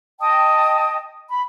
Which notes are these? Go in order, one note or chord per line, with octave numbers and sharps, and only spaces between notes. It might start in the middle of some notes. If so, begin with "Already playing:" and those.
D#5 G5 A5 D#6
B5